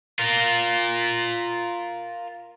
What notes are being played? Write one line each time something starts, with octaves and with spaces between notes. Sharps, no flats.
F4 A#4